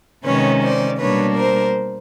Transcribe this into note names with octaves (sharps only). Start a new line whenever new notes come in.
C3 D#3 G#3 C#4 B4 C#5
C5 D5
B2 G3 A#3 D4 B4 C#5
A#4 C5